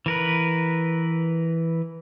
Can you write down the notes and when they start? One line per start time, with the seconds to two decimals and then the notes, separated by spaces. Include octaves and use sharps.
0.06 E3 A#4 B4